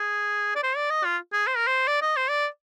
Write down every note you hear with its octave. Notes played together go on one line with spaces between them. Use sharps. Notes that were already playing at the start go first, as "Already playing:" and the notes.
Already playing: G#4
D5
C5
D5
D#5
F4
G#4
C5
A#4
C5
D5
D#5
C5
D5